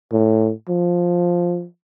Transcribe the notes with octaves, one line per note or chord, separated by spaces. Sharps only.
A2
F3